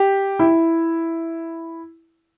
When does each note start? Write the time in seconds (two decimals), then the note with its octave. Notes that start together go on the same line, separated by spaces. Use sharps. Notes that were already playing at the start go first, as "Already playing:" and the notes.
Already playing: G4
0.39 E4